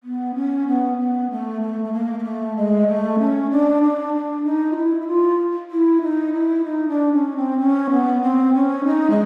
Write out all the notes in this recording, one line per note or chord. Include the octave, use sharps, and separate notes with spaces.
B3
C#4
B3
B3
A3
A3
A3
A#3
A#3
A3
G#3
A3
C#4
D4
D4
D4
D#4
F4
E4
E4
F4
E4
D#4
E4
D#4
D4
C#4
C4
C#4
B3
C4
C#4
D#4
G#3